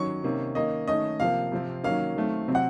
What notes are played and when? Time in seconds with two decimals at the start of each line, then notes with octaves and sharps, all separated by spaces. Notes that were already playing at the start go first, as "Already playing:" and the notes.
Already playing: D#3 F#3 C#4 C#6
0.24 C3 D#3 A#3 C#4
0.55 D#3 A#3 C#4 D#5
0.87 D#3 A3 C#4 D#5
1.20 C3 F3 A#3 F5
1.51 C3 F3 C4
1.84 D#3 F#3 A#3 C#4 F5
2.16 D#3 F#3 A3 C4
2.48 C3 F#3 C4
2.55 F#5